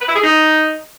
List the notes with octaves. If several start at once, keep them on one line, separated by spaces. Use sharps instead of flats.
B4
E4
G#4
D#4